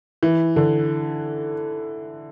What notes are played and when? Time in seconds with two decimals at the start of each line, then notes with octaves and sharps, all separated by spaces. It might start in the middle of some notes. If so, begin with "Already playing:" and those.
0.23 E3
0.56 D3